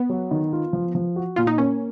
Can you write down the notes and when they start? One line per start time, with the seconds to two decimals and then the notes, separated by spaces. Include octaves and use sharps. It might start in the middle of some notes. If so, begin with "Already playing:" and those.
Already playing: B3
0.09 F#3
0.31 D#3
0.53 F4
0.73 F3
0.95 F3
1.16 F#4
1.36 A#2 F4
1.47 D#4
1.58 A#3 C#4